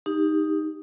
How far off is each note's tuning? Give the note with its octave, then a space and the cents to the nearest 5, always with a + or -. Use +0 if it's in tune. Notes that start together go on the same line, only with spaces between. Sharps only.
D#4 +0 G4 +20